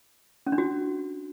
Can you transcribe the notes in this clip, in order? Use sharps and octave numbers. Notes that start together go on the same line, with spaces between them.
C#4
D4
F#4